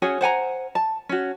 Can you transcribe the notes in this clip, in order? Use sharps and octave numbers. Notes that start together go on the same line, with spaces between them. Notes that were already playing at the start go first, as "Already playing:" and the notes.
C#4 F#4 G#4 C#5
C5 F#5 G#5 A#5
A5
C#4 F#4